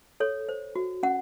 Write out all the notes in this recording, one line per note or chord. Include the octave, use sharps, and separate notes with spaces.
A4 C#5
C5
F#4
C#4 F#5